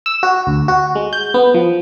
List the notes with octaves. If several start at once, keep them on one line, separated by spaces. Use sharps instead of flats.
E6
F#4
D2
F#4
G#3
G6
B3
F3